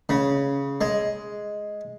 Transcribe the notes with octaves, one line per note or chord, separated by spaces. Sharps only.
C#3
G#3